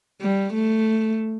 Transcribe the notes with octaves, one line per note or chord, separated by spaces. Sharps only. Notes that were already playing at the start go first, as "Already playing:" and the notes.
G3
A3